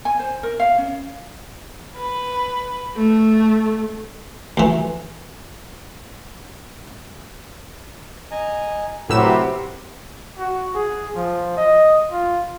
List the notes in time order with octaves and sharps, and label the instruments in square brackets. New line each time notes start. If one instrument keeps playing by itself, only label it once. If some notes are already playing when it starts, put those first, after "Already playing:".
[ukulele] G#5
C5
A#4
F5
C#4
[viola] B4
A3
[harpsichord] D2 E3
[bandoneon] D#5 G#5 A#5
[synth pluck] A2 E6 E7 [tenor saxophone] C3 [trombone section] F#3 [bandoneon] G4 A#4 B4
[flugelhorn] F#4
G#4
F3
D#5
F4